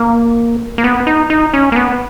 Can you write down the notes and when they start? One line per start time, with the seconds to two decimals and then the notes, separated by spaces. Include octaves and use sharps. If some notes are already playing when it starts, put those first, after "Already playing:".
Already playing: A#3
0.78 A#3
0.84 B3
1.07 D#4
1.30 D#4
1.54 C#4
1.72 A#3
1.76 B3